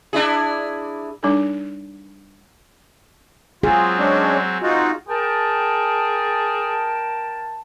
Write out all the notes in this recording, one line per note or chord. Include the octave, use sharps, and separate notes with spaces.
D4 E4 G#4
G3 D4 D#4 A4
F#3 C4 F4 G#4
G#3 C#4 D4
C4 D#4 F4 F#4
G#4 A#4 G5 A5